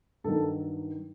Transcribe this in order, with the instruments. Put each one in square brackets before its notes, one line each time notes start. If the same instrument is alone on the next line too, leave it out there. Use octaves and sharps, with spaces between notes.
[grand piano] G2 D#3 F#3 A4